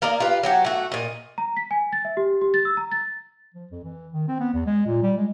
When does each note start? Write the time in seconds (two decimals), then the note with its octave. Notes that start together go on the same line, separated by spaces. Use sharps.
0.02 A#3 A#4 D5 D#5
0.20 F4 G4 B4
0.43 F#3 F#4 G4
0.65 A3 F#4
0.92 A#2 D#5
1.38 A#5
1.57 B6
1.71 G#5
1.93 A6
2.05 E5
2.17 G4
2.41 G4
2.54 A6
2.65 E6
2.77 A#5
2.92 A6
3.54 F3
3.71 F2
3.84 E3
4.13 D#3
4.28 C4
4.40 B3
4.54 E2
4.66 G#3
4.86 A#2
5.03 G3
5.17 G#3